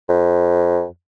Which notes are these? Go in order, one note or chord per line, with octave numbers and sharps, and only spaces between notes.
F2